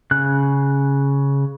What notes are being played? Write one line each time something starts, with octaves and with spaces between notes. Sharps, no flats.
C#3 F#6